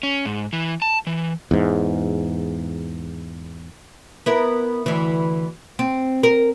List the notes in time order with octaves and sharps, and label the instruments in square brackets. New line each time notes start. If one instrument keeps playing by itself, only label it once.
[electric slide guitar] C#4
G#2
E3
A5
E3
[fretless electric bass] E2 G#2
[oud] B3 E4 A#4
D2 E3
C4
A#4